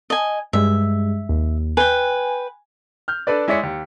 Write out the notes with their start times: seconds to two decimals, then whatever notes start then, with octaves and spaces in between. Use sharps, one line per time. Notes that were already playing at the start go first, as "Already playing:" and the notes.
0.10 D#5 G#5
0.53 G2 G#3 E5
1.29 D#2
1.77 B4 G5 G#5
3.08 F6 G6
3.27 D4 A4 B4 D5
3.48 G#3 E4 C#5 D5 B6 C#7
3.63 D#2